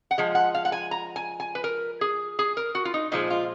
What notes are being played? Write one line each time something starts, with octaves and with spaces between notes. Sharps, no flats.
F#5
F3 G#3
F#5
F5
F#5
G#5
A#5
G#5
G#5
B4
A#4
G#4
G#4
A#4
F#4
F4
D#4
A#2 F3 G#3 D#4
F4